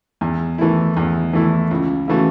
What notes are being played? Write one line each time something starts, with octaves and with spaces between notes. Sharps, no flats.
E2
E3 A3 E4
E2
E3 A3 E4
C#2
C#3 E3 A3 F#4